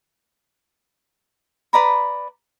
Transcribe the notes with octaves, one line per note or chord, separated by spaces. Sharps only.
B4 D5 A#5 B5